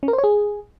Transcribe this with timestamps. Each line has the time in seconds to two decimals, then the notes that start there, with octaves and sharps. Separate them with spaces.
0.03 C#4
0.08 A#4
0.13 C5
0.18 C#5
0.24 G#4